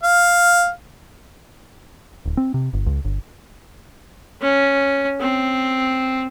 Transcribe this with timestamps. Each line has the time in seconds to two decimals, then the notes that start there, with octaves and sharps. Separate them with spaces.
0.03 F5
2.26 D1
2.37 C4
2.54 C3
2.73 G1
2.86 C#2
3.05 G1
4.42 C#4
5.21 C4